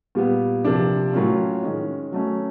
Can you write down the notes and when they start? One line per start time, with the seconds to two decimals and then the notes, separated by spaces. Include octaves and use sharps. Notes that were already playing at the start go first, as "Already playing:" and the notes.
0.15 A#2 G3 B3
0.64 C3 F3 A#3 D4
1.13 A2 F#3 A#3 C#4 F4
1.63 D#3 G#3 C#4
2.12 F#3 A3 C#4